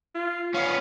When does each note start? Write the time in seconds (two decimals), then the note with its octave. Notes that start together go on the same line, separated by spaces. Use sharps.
0.15 F4
0.55 B3 C#4 F5